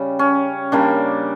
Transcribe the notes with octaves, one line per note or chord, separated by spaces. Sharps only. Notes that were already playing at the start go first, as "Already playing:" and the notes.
Already playing: C#3 G3
C#4
C#3 G3 A#3 D4